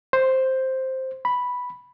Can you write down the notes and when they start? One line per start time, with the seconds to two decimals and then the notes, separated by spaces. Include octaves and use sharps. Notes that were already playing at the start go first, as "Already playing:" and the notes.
0.13 C5
1.25 B5